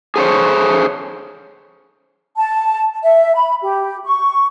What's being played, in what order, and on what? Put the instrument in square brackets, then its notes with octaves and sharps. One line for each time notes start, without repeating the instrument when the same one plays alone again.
[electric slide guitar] G#4 A4 C5 C#5
[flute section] A5
E5
B5
G4
C#6